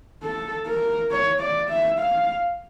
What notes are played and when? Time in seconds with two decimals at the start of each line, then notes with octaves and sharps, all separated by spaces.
0.23 A4
0.67 A#4
1.11 C#5
1.41 D5
1.70 E5
1.99 F5